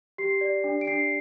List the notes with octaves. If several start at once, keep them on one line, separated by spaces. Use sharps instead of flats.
G4 C7
D5
D4
D7
D4 C7